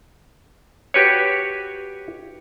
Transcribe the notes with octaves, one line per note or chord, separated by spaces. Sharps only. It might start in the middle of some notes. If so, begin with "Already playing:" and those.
F#4 G4 B4 C#5